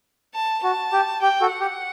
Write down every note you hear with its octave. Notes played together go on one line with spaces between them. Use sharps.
A5
F#4 A5
G4
G4 G5
F#4 A4
F#5
G4